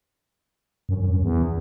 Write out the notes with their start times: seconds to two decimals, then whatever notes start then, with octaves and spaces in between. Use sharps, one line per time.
0.89 F#2
1.00 F#2
1.11 F#2
1.22 E2